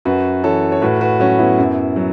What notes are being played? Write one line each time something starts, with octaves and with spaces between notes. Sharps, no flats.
F#2 F#4 B4
E3 A4 C#5
C#5
A2 F#4 B4
F#4 B4
F#3 C#4 F#4
B3 E4
F#2
F#3